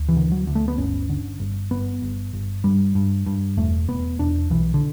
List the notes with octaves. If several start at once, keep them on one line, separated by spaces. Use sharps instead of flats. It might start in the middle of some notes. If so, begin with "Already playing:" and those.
Already playing: D2
E3
D3
F#3
D2
A3
B3
G1 C#4
D3
G1
G1 B3
G1
G1
G2 G3
G2
G2
E1 A3
E1 B3
E1 D4
B1 E3
D3